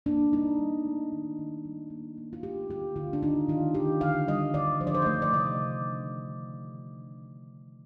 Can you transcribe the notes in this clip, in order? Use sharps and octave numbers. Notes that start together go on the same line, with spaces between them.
A#3 D4
G3 D#4
G3
A3
D#3
D#3
G3
A#3
A#3
F4
A3 G4
D3 G4
D3 F4
D4
D#3 D#4
D#3 F4
D#3 G4
D3 F5
G3 D#5
D3 D5
F3 C5
D5
C5
D#5
A3 D5
D5
C3 D#5